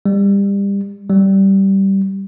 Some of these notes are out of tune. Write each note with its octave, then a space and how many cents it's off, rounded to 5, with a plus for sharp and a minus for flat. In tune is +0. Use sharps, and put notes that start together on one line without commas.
G3 +30
G3 -10